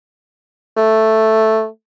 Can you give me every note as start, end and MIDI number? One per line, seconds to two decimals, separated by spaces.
0.77 1.67 57